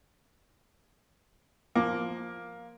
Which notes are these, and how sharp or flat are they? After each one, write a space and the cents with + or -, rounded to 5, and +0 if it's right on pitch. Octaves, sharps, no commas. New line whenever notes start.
F3 +0 A#3 +10 D6 +0